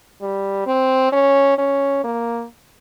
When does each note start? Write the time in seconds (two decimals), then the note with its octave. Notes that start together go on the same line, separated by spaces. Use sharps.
0.21 G3
0.67 C4
1.12 C#4
1.58 C#4
2.04 A#3